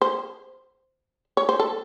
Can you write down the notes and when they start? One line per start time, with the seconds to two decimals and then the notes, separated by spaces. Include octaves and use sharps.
0.02 C5
1.37 C#5
1.49 C5
1.60 A4